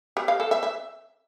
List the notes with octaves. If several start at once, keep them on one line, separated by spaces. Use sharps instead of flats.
G4
F5
A4
E5
E5